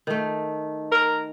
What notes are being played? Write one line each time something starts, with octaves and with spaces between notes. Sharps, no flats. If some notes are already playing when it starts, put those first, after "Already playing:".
D#3 A3
A#4